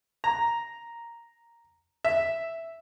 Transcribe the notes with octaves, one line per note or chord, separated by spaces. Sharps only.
A#5
E5